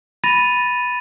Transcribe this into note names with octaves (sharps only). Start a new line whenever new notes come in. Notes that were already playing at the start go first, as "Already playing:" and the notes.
B5 A6 A#6 D#7